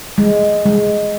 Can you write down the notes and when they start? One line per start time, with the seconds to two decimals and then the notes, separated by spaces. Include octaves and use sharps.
0.18 G#3
0.66 G#3